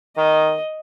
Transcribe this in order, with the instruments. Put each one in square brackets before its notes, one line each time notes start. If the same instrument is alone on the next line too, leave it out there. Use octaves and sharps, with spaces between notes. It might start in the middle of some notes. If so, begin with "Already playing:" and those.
[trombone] D#3 [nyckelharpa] D#5